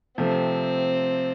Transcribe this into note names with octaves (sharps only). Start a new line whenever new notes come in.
C3 F3 A3 C4